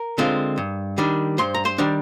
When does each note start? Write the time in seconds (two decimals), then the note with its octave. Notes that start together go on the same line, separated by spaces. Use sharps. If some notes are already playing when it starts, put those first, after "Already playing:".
Already playing: A#4
0.18 D3 G#3 C4 F4
0.58 G2
0.98 D#3 G3 D4
1.38 G2 C5 C6
1.55 A#5
1.65 C5 C6
1.78 D#3 G3 D4